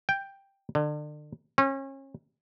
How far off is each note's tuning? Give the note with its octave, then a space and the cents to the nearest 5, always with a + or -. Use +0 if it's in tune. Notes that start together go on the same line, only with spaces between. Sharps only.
G5 +5
D3 +35
C#4 -35